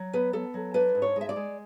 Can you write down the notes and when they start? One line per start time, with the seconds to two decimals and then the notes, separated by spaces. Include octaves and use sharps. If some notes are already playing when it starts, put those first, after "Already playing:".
Already playing: F#3
0.13 B3 B4
0.33 B3 A4
0.54 F#3
0.74 D4 B4
0.95 G#2
1.02 C#5
1.16 G#3 E5
1.29 D5
1.36 G#3